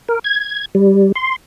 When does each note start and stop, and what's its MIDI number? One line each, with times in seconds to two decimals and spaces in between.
0.09 0.19 70
0.24 0.65 92
0.75 1.12 55
1.15 1.36 84